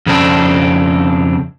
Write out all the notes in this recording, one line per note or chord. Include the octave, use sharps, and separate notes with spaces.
F2 C#3 C4 D4 A4